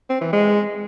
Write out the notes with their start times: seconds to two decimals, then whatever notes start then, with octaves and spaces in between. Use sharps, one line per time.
0.10 C4
0.21 E3
0.33 G#3